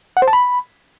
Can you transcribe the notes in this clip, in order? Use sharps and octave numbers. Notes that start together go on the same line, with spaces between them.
F#5
C5
A5
B5